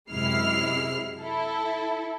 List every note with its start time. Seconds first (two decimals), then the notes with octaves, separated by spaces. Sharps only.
0.10 F#2 C3 G#3 E4 F6 C7
1.19 E4 A4